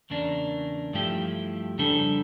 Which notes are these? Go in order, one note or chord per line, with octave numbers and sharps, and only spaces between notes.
E2 C#3 A#3 D4
G2 F3 A3 E4 G4
F2 C#3 G3 D4 A4